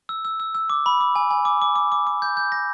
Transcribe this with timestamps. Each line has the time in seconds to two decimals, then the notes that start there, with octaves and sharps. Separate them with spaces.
0.09 E6
0.25 E6
0.40 E6
0.55 E6
0.70 D6
0.86 B5
1.01 D6
1.16 G#5
1.31 G#5
1.45 D6
1.62 D6
1.76 D6
1.92 D6
2.07 D6
2.22 G6
2.37 G6
2.52 A#6